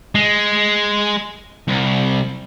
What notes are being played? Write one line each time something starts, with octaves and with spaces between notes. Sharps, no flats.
G#3
C2